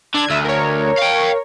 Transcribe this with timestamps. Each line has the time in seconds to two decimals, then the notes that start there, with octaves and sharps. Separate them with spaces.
0.14 D3 D4 G#6
0.30 D2 E5 D#6 E6
0.45 A#4 C#5
0.98 F5 G5